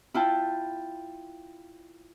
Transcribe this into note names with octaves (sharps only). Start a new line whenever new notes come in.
E4 F4 G5 A5